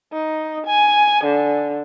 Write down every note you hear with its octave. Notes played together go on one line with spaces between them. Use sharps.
D#4
G#5
D3